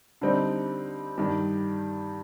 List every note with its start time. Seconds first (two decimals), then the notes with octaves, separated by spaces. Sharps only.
0.21 D3 G3 C4 D#4
1.18 G2 D#3 G3